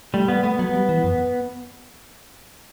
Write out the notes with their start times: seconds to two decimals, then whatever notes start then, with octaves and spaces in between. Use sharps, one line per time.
0.14 G3 A3
0.28 G3 B3
0.43 A3 B3
0.59 F#3 B3
0.73 G3
0.89 E3
1.04 F#2